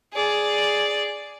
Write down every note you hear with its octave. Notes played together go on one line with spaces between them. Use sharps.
G#4 D5